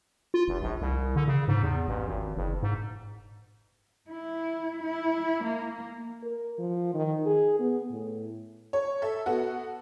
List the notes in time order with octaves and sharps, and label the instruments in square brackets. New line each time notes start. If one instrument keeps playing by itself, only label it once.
[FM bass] F4
F1
A#1
C2
D3
C#3
G#2
E2
A1
G#1
F#1
G#2
[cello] E4
E4
A#3
[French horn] A#4
F3
D#3
G#4
B3
A2
[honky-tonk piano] C#5
A4 E5
B3 F#4 A4 F#5